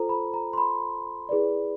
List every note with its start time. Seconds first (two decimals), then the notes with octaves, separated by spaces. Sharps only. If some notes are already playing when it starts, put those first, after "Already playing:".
Already playing: F4 A4 C5 A#5
0.09 B5
0.34 A#5
0.53 C6
0.58 B5
1.29 E4 G#4 B4 D5